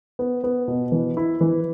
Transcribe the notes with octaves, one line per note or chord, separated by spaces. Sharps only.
B3
B3
B2
E3
E4
E3